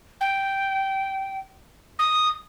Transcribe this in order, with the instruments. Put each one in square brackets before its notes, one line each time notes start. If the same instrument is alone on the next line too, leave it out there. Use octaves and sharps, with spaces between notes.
[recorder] G5
D#6